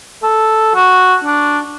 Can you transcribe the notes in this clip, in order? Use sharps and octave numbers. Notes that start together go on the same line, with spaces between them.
A4
F#4
D4